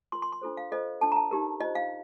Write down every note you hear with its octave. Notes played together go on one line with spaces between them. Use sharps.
F4 A#4 C6
C6
C6
D4 F4 A4 C5
F5
F4 A4 C5 D#5
D4 F4 A4 A5
A#5
A5
D#4 G4 A#4
F4 C5 D#5
F5